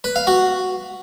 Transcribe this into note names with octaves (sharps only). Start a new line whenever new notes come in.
B4
F5
F#4